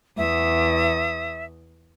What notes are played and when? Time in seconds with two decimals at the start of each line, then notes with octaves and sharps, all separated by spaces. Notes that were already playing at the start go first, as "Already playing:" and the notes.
0.18 E2 E5 D#6